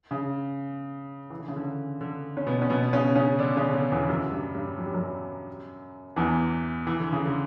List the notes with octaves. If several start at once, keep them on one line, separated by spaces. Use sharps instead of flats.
C#3
E3
D3
C#3
D3
D3
C#4
B2 B3
C#4
B2 B3
C#3 C#4
C#3 C#4
D3 D4
C#3 C#4
D3
E2 E3
F#2 F#3
G2 G3
G2 G3
F#3
G3
F#2 F#3
E2 E3
E3
D3
C#3
D3